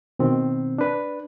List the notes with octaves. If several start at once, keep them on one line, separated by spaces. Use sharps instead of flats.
B2 D#3 C4
D4 B4